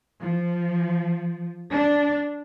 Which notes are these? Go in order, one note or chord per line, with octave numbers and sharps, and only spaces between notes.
F3
D4